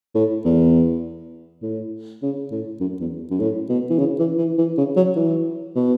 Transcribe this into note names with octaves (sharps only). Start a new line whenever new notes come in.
A2
E2
A2
C#3
A2
F#2
E2
F#2
A2
B2
E3
C#3
E3
E3
E3
C#3
F#3
E3
B2